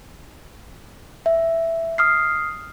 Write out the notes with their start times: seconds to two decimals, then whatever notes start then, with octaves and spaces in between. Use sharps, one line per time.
1.26 E5
1.98 D#6 F6 C7